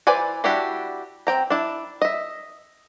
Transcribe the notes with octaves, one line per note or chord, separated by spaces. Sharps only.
E3 B4 C5 D5 G#5
G3 D4 E4 F#4 G4
C4 G5 A#5
D4 E4
D#5 E5